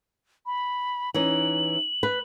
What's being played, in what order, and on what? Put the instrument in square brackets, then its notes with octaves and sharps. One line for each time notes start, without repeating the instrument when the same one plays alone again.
[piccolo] B5
[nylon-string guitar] E3 C#4 D#4 [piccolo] F#7
[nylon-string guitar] B4